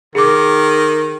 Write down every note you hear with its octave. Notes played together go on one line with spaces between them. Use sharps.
D#3 G#4 D6